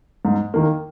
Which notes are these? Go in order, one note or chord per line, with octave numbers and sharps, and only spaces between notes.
G#2
D#3 A#3